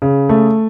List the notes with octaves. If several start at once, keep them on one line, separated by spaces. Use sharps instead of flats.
C#3
A3